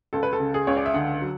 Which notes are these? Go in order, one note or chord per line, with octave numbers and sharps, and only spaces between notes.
C#2 A4
B4
A4
C#3
G#4
C#2 C#5
D5
E5
D3 F#5
F#3